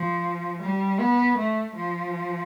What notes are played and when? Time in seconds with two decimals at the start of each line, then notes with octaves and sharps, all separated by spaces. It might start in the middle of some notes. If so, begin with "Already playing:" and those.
Already playing: F3
0.63 G3
1.00 B3
1.38 A3
1.76 F3